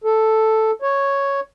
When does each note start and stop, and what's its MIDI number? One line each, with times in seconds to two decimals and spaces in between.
0.04 0.71 69
0.82 1.40 73